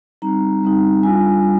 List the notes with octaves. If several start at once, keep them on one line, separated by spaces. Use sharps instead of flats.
G3 C4 D#4 A#5
G3 C4 D#4
G3 D4 F4 G#5
G3